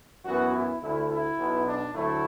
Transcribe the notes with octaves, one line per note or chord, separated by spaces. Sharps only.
F#2 E3 B3 F#4
E4
D2 D3 A3 E4
E4
B1 B2 B3
D4
D2 D3 F#3 A3 E4